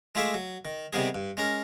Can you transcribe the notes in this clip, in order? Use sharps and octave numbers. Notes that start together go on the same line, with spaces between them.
G#3 A3 F4 G#4 E5 D6
F#3
D#3
C3 D#3 G3 B3 G#4
G2
G#3 C#4 A#4